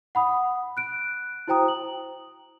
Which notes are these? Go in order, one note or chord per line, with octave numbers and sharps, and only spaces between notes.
F#5 B5 D#6
F#6 D7
E4 F#4 C5 G5 A#5 D#6
F#7